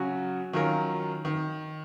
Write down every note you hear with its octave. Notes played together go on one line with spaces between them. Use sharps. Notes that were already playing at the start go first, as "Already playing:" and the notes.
Already playing: C#3 F#3 C#4 F#4
D#3 F#3 C#4 F4 A#4
D#3